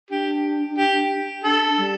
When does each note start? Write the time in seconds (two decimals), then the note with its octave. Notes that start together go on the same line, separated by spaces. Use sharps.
0.11 D4 G4
0.77 G4
1.44 D4 A4
1.77 G3